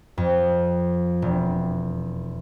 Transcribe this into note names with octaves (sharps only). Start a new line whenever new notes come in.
F2
E1